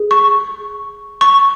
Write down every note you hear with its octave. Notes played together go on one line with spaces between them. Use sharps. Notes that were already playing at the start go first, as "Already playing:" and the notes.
Already playing: G#4
C#6
C#6